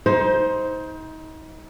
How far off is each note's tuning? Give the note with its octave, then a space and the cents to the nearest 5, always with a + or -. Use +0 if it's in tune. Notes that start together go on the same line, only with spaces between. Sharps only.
D#4 +30 C5 +0